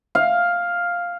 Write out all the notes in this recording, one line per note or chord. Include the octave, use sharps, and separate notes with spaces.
F5